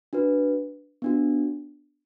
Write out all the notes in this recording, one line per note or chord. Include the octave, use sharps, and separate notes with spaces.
D4 F#4 B4
B3 D4 F#4